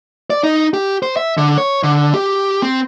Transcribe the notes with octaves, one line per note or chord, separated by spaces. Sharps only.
D5
D#4
G4
C5
E5
D3
C#5
D3
G4
C4